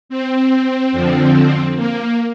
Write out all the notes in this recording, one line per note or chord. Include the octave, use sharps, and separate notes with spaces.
C4
F2 D3 F3
A#3